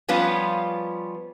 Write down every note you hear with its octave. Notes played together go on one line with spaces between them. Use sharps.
F3 G3 B3 C#4 F4